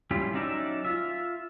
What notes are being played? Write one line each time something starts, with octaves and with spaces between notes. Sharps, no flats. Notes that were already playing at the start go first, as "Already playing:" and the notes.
G3 C#4 E4 F4 G4
F#3 C#4 D#4 D5 E5
F4 E5